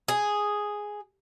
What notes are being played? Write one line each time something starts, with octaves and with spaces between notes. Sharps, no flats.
G#4